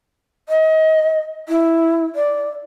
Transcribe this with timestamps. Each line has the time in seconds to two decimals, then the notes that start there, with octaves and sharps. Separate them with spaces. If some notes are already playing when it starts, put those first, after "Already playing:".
0.49 D#5
1.48 E4
2.15 D5